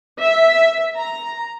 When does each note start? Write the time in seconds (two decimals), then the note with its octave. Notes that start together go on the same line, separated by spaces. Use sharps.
0.21 E5
0.97 A#5